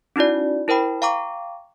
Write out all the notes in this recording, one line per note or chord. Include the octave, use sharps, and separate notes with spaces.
C#4 D#4 E4 F#4 D5
E4 A#4 C5 G5 B5
F5 G5 A#5 C#6 D6